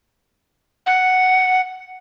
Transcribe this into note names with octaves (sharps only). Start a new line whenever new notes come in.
F#5